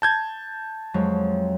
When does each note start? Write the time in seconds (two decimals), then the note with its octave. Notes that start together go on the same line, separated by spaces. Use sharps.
0.02 A5 G6 G#6
0.94 F2 F#3 G#3